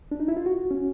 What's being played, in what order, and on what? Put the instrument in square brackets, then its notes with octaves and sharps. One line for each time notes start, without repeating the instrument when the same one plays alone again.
[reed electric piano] D4
D#4
E4
F4
F#4
C#4